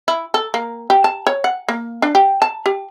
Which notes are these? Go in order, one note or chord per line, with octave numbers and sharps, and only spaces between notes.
E4
A4
A#3
G4
A5
C#5
F#5
A#3
D4
G4
A5
G4